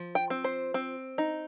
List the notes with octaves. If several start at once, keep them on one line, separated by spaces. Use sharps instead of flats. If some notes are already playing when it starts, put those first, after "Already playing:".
Already playing: F3
G5
C4
C5
C4
D#4